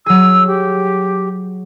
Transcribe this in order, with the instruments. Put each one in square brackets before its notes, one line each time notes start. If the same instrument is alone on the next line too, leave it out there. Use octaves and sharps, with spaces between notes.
[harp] F#3 G#4 [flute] E6
[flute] G4